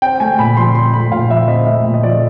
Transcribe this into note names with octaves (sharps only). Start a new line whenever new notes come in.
C4 G5
A3 G#5
A#2 B5
F3 C6
C4 C6
A3 B5
A#2 F5
F3 E5
C4 D#5
A3 E5
A#2
D#5
F3 D5